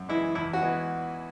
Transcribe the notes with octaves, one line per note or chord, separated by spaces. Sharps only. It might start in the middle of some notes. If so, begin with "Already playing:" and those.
Already playing: F#2
E3 G#3 E4
E2 E4
F#4
E3 G#3 B3